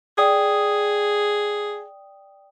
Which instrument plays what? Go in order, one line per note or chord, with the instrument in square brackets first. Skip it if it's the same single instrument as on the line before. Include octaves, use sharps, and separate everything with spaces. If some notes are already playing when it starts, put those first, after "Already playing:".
[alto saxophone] G#4 [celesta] D5 G5 D#6